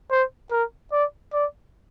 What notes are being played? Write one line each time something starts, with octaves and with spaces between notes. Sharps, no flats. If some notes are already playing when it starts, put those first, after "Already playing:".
C5
A#4
D5
D5